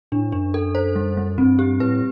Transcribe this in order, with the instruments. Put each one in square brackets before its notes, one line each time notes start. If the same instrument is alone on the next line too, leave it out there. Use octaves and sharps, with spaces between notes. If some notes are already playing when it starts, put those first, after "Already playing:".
[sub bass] A2 [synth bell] D4
[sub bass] F#2 [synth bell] D4
[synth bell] A4
C5
G3
G3
[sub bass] G2 [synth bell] C4
[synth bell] G4
[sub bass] A2 [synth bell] B4